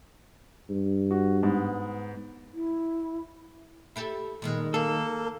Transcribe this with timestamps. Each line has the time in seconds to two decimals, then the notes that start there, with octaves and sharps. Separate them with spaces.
0.70 G2
1.11 F#4
1.43 G#2 B3
2.54 E4
3.96 E4 G4 A4
4.42 A#2 D#3 G3 G#3
4.74 A#3 G#4 A4